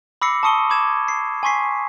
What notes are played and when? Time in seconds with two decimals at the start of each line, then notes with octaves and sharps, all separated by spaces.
0.22 B5 D6 E6 A#6 C7 C#7
0.43 A5 C#6 D#6 C#7 D#7 G7
0.70 B5 D6 G#6 E7
1.08 C7
1.43 G#5 C6 C#6 B6 C7